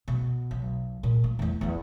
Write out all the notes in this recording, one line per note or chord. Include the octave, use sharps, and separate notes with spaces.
B2
B1
A#2
A#3
E2 A3
E2 E3